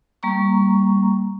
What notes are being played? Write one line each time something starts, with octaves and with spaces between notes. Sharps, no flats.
G3 A#3 A#5 C#6